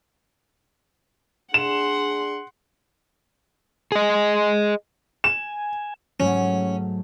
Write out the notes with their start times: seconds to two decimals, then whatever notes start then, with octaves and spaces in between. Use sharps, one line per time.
1.54 D4 G#4 F#5 C6 E7
3.92 G#4 D#5
5.24 G#5 E7
6.20 G#2 F#3 A3 C#4